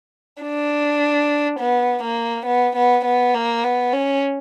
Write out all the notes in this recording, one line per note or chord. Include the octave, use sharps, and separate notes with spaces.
D4
B3
A#3
B3
B3
B3
A#3
B3
C#4